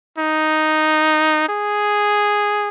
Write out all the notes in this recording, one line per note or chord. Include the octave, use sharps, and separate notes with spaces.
D#4
G#4